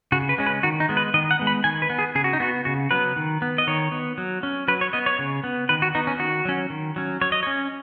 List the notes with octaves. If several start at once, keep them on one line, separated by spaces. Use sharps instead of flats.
C#3 F#4
B4
G#3 C#4
B4
D#3 F#4
D#4
G#3 B3
B4
D#3 D#5
F#5
G#3 B3
B5
D#3 G#5
B4
B3
G#4
C#3 G#4
F#4
D#4
B3 F#4
C#3 F#4
F#3 B3 B4
D#3
B3
D#5
D#3 C#5
B3
F#3
C#4
F#3 B4
C#5
B3 D#5
C#5
C#3
B3
D#3 B4
F#4
B3 D#4
C#4
D#3 F#4
F#3 C#4
D#3
F#3 C#4
F#3 C#5
D#5
C#4 C#5